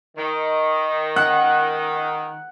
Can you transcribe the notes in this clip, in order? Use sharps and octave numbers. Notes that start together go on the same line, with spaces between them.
D#3
F#5